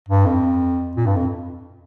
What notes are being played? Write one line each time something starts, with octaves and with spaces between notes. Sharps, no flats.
G2
F2
A#2
G2
F2